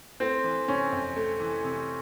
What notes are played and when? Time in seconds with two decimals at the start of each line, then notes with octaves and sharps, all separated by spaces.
0.20 A3 C4
0.44 E3
0.68 C3 C#4
0.93 F2
1.16 A3
1.40 E3
1.64 C3